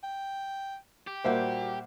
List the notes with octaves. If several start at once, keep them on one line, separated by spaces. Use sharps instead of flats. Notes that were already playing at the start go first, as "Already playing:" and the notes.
G5
G4
A#2 G3 A#3 F#4 C5 E5 F#5